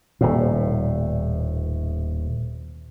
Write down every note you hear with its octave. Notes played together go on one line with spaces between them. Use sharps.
D#1 A2